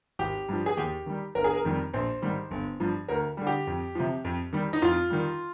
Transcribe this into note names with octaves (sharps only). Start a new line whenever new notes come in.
G#1 G4
G2 F3
G#4
D#2 G4
D#3 G3
G1 A#4
G#4
A#4
F2 D#3 G3
A#1 C5
G#2 D#3 G3
G1
G2 F3
D2 A#4
D3 G3
G4
F2
C3 F3
F2
D#3 G3
D#4
F2 F4
D#3 G3